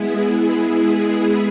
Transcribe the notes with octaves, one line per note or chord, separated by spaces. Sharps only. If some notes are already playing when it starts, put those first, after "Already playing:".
Already playing: G#3 B3 E4 G#4